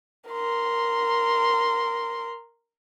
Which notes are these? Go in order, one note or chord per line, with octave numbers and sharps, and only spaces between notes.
A#4 C6